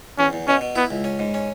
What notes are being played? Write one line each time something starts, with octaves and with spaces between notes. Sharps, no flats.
E2 C#4
E2
B2 C#4
B2
B3 E4
C#2
C#4
G#2
C#4